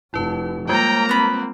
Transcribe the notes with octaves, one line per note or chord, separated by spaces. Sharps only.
F1 E4 B4 A5
G3 G#3 A#3 F4 G5 A#5
B3 C4 B5